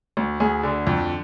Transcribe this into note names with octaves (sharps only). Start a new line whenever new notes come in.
D2
D2 G#4
D3
F2